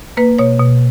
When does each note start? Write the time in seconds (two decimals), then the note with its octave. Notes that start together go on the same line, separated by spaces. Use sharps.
0.17 A#3 B4
0.39 B2 C#5
0.60 B2